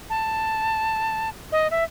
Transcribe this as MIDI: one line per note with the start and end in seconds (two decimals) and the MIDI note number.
0.10 1.29 81
1.52 1.68 75
1.71 1.84 76